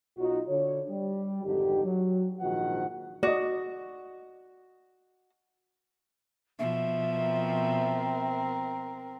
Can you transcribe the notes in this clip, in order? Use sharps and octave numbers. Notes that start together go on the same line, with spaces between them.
B1 F#3 D#4 F4 F#4
D3 C#5
G3
G#1 F2 D3 D#4 G4
F#3
A#1 G#2 D#3 F3 F#4 F#5
F#4 D5 D#5
B2 F3 E5
C4 A#4